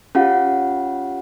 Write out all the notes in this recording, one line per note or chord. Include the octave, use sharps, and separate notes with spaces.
C#4 F4 G4 F5 F#5